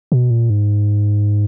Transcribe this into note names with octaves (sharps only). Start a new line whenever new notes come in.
B2
A#2
G#2